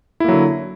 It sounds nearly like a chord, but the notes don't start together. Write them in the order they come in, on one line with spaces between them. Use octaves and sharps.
E4 A#3 F#3 D3